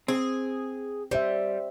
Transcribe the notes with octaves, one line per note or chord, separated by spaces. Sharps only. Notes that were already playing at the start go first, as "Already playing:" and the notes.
C4 G#4
G3 C5 E5